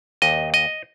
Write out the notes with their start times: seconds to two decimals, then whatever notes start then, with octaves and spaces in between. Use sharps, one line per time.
0.22 D#2 D#5
0.54 D#5